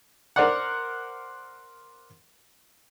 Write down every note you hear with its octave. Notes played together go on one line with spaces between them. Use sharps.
A#4 C5 D5 F#5